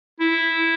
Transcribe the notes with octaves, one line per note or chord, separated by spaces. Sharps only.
E4